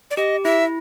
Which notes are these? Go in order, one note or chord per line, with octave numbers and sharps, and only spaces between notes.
D5
G4 D#5
E4 E5